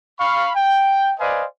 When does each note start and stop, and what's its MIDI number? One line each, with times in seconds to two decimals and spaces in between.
0.20 0.51 77
0.20 0.51 83
0.20 0.51 85
0.55 1.12 79
1.20 1.44 71
1.20 1.44 72
1.20 1.44 74
1.20 1.44 75
1.20 1.44 77
1.20 1.44 80